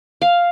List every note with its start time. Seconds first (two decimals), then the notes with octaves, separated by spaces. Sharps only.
0.22 F5